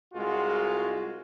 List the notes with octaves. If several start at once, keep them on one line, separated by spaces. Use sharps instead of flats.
C2 G#3 F4 F#4